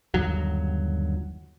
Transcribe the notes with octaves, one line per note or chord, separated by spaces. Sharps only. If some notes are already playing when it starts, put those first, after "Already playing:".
G1 D#2 F#3